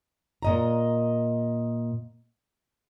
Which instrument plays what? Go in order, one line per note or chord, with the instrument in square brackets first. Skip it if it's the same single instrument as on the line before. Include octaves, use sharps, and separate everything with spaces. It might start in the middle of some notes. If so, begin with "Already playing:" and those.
[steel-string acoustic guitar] A#2 D#5 A#5